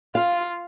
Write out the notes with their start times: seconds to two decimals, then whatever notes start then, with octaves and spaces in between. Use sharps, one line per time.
0.15 F4 F5